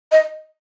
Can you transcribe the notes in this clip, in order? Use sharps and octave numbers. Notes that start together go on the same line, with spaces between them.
D#5